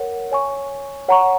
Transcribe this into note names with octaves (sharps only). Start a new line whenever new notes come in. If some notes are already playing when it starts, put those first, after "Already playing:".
Already playing: A#4 C#5 F#5
C#5 G#5 C#6
C#5 F#5 A#5 C#6